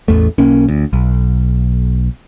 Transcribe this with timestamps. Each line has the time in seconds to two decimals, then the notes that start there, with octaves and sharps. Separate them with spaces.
0.08 A1 E2 A3
0.38 B1 A#3 C#4
0.69 D2
0.93 B1